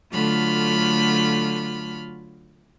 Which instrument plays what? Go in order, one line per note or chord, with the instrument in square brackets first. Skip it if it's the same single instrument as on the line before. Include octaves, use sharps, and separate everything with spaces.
[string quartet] D3 F#3 A3 F4 B5 F6